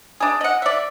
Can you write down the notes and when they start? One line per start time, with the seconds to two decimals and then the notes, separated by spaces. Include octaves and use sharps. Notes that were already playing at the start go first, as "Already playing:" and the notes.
0.20 D4 G#4
0.41 D#5 F#5
0.62 D5 E5